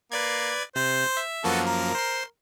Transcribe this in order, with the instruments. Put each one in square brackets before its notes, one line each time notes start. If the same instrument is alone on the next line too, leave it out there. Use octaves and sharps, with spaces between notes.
[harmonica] A#3 [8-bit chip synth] B4 D5 G#6
[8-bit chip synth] C3 [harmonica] C5
[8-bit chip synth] E5
[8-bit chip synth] F#2 F3 A#3 [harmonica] B3 F#4 A4
[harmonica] A#4
[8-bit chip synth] C5 C6